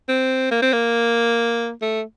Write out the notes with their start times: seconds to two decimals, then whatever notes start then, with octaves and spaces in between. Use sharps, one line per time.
0.09 C4
0.51 A#3
0.62 C4
0.73 A#3
1.82 A3